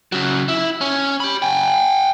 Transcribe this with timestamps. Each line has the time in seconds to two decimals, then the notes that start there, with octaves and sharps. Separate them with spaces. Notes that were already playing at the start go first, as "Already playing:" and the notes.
0.12 C#3 F#3
0.48 E4
0.81 C#4
1.20 G4 B5
1.42 G5 G#5